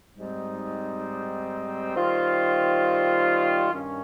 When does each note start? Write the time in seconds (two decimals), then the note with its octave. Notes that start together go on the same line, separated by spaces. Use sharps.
0.16 G#2 G3 C4 D#4
1.95 D#3 G3 C4 F4
3.72 G2 D#3 C#4